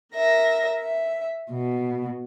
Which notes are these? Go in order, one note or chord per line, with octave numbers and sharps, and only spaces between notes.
A#4 E5 A#6
E5
B2